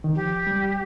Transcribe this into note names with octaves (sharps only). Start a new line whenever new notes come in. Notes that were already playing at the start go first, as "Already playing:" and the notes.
D#3
F3 G4
G3